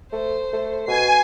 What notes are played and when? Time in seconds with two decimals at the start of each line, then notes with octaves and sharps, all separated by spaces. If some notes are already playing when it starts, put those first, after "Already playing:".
0.13 A3 C5
0.53 A3
0.88 B2 G#5 C7